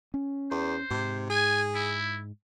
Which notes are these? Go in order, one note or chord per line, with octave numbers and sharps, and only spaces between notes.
C#4
E2 C5
G#2 C3
G#4 G#5
E4